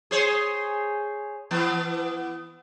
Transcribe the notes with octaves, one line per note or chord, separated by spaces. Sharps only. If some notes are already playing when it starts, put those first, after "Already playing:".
G#4 C5 C#5
E3 B3